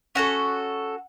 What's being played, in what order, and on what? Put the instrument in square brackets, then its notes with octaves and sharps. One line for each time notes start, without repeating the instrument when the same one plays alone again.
[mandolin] C#4 F#4 A4 F#5